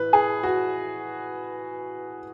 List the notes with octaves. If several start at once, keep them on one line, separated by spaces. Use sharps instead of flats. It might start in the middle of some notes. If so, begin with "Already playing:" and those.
Already playing: A2 E3 B4
G#4
F#4